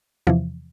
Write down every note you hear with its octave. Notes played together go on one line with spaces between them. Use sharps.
E2 C3 E3 F3